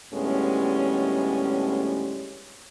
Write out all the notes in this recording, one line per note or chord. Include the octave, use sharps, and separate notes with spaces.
D2 A2 G3 G#3 B3 C#4